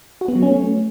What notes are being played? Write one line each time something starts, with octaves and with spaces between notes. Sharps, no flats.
F#4
B3
F#3
C#4
A3